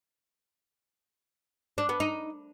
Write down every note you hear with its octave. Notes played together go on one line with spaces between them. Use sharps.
D4
B3
D#4